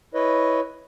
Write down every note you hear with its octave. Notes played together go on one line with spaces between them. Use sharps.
E4 B4 C#5 D#5